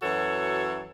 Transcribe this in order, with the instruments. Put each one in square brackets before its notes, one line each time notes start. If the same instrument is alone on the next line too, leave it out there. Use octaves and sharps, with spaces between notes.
[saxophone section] F#2 E3 F#4 A4 C#5